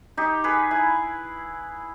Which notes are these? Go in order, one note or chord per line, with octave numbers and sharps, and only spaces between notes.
D#4 G4
G#4 B4
E4 G#4